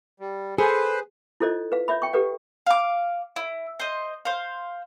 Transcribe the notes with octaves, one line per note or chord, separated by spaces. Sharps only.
G3
G#4 A4 B4 C5 G#5
E4 F4 A4 C5 D5 D#5
B4 F5
C#5 D5 E5 B5
G5 C#6
G4 A4 B4 D5 F#5
F5 D6
E4
C5 D#5
C5 F5